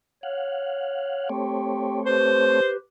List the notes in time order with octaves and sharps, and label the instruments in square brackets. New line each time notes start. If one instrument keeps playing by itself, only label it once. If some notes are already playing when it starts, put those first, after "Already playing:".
[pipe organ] C#5 [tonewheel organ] F5 F#5
[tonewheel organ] A3 C4 C#5 [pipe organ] G4 G5
[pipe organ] G4 B4 [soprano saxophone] C5